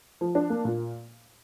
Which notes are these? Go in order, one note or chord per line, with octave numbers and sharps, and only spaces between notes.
F3
D4
A#3
A#2